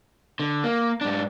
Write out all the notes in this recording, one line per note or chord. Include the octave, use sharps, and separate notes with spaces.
D3
A#3
G#2 D4